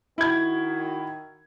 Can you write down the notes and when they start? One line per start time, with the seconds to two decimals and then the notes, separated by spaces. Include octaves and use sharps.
0.18 D#3 E4 F#4 G#6